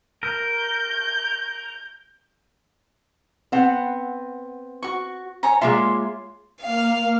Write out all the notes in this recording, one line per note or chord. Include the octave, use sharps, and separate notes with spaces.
A#4 G6
B3 C4 F#5
F#4 C#6
C#5 G#5 A#5
G#3 A#3 F4 C#5 E5 C6
A#3 F5 F6